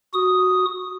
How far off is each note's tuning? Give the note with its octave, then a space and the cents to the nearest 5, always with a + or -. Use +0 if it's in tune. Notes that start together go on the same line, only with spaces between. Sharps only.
F#4 +0 D#6 +0